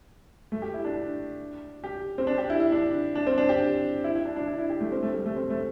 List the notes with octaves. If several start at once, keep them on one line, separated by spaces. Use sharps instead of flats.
A3
G4
E4
D4
G4
C4
D4
G4
E4
E4
D4
D4
C4
D4
G4
E4
E4
D4
D4
E4
E4
G4
A3
C4
A3
G3
A3
C4
A3